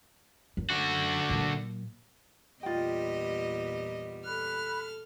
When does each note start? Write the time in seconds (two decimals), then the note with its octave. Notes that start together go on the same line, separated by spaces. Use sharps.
0.57 F#2
0.70 D3 F#4
1.30 A#2 F#3
2.63 E2 A#2 G3 F4 D#5 G5
4.25 A4 B5 F6 F#6